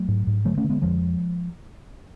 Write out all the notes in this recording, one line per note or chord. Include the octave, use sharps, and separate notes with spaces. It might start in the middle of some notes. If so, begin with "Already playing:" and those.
Already playing: F#3 A3
G#2
G#2
D3 F#3 A3
A3 C#4
D3
G#3 B3
F2 F3 G#3